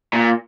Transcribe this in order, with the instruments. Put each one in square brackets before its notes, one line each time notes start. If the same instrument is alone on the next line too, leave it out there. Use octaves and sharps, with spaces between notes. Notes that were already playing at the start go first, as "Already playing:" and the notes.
[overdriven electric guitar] A#2